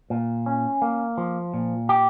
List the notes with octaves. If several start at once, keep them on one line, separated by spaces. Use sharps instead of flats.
A#2
C#4
A#3
F3
A#2
G4